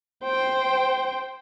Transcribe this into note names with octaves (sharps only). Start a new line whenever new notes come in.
C5 G5